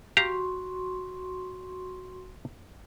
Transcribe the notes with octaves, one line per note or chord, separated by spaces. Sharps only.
F#4 G4 F5 A#5 C6 C#6